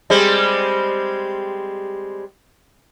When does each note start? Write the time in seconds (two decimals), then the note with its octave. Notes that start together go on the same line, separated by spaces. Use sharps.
0.10 G3 G#3 C4